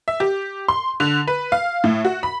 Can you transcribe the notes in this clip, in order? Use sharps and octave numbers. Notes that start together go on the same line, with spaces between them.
E5
G4
C6
D3
B4
F5
A2
F#4
B5